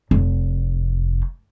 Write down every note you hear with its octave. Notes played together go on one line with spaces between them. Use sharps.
F1